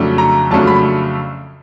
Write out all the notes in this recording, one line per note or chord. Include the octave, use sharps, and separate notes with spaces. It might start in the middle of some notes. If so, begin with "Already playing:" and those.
Already playing: F2 C#3 F#3 A3 D4
A#5
F2 C#3 F#3 A3 D4 A5
B5